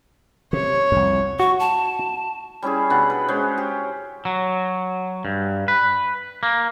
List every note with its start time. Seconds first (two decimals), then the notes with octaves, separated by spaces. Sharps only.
0.53 C3 C#5
0.92 C2 F2
1.40 F#4 C#6
1.59 A5
2.62 G3 C#4 E4 G#4
2.90 B2 D4 F#5
3.10 B4
3.28 G#3 C#4 C5
3.58 G4
4.25 F#3
5.25 G2
5.68 B4
6.43 A#3